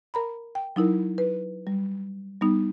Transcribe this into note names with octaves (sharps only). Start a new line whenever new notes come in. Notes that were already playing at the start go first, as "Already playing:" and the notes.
A#4 A#5 B5
G5
F#3 D#4 E4 A#4
B4
G3
G3 B3 D#4